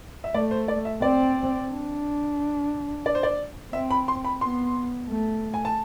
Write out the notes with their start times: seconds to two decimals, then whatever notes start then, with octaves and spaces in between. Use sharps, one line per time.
0.24 E5
0.34 A3 D5
0.51 C5
0.68 D5
0.85 E5
1.02 C4 D5
1.70 D4
3.06 D5
3.15 C5
3.23 D5
3.73 C4 E5
3.91 B5
4.08 C6
4.25 B5
4.41 B3 C6
5.10 A3
5.54 G#5
5.65 A5